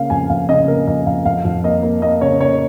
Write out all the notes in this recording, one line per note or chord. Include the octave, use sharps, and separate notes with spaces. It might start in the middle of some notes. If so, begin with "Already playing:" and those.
Already playing: C#3 A#3 F5
F2 G#5
F2 F5
C#3 D#5
A#3 A#4
F2 D#5
F2 F5
F2 F5
F2
A#3 D#5
A#3
A#3 D#5
C#3 C#5
A#3 C#5